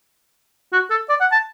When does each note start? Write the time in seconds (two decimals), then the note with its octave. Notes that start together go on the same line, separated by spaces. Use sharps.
0.73 F#4
0.90 A4
1.09 D5
1.21 F#5
1.32 A5